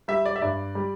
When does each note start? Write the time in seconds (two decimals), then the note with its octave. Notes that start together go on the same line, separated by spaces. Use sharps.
0.08 G3 E5
0.25 D5
0.36 E5
0.42 G2 D5
0.75 G3